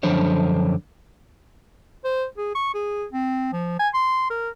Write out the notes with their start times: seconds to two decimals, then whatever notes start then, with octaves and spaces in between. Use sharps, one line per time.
0.03 F#2 D3 F3 D4 C5 C#5
2.04 C5
2.37 G#4
2.55 C#6
2.74 G#4
3.13 C4
3.53 F3
3.79 G#5
3.94 C6
4.30 A#4